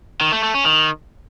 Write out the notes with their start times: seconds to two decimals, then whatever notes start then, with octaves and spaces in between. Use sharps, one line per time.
0.21 D#3
0.32 A3
0.43 A3
0.54 C#4
0.65 D#3